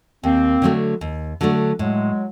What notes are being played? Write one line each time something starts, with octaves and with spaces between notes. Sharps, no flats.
D#2 A#3 C4
D3 F#3 A3 D4
D#2
D3 F#3 A3 D4
A2 F#3 G#3